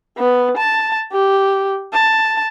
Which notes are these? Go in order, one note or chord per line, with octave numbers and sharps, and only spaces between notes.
B3
A5
G4
A5